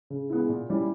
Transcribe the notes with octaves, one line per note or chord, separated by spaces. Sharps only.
C#3
G#3 B3 E4
A#2
G3 C#4 E4